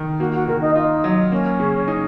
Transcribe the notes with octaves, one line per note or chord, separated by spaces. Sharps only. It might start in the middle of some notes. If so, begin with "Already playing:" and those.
Already playing: D#3
A#3 F#4
F#4
D#3 A#4
D#4
D#4 F4
F#3
A#3 C#4
C#3
D#4